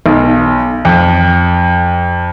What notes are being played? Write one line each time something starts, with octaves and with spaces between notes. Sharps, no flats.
B1
F2